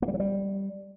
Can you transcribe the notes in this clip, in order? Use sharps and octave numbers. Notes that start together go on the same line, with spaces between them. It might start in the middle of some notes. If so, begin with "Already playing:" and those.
A#3
G3
F#3
G3